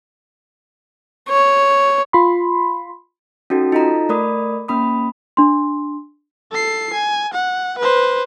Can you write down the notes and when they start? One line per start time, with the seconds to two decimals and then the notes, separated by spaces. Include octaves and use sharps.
1.29 C#5
2.13 F4 B5 C6
3.50 C#4 D#4 F#4 A4
3.72 D#4 F4 A4 D#5 A#5
4.09 A3 A#4 D5 B5 D#6
4.68 A#3 C#4 B5 D#6
5.37 D4 C6
6.51 A4 C7
6.93 G#5
7.33 F#5
7.78 B4 C5